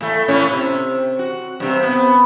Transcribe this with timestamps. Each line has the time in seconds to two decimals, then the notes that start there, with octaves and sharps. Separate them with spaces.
0.01 A2 A3
0.28 A2 C#4
0.52 C3
1.19 F#4
1.60 G2 C3
1.83 B3